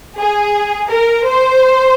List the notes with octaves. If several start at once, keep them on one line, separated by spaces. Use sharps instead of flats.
G#4
A#4
C5